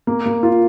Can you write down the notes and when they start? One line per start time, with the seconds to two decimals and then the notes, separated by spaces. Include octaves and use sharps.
0.07 A#3
0.26 A#3
0.43 F4